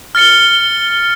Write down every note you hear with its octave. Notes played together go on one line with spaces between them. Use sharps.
F6 A6 C#7 G7